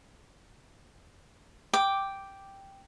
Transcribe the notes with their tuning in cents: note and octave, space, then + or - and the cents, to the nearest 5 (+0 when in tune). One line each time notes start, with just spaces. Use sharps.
G5 +0 D6 +0